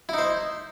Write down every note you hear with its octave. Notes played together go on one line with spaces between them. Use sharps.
D#4 E4 C5